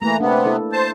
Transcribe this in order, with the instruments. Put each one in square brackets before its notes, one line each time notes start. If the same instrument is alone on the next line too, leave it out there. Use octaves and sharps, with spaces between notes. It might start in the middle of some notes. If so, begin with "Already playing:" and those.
[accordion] E3 A#5 [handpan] A3 A#3
[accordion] C3 B3 [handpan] D4
[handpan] E4 A4 B4
[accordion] C5 A5